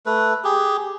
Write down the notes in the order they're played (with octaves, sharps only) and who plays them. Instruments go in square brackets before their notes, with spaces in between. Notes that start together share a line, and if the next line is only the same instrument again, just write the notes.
[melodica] A3 B4
G4 G#4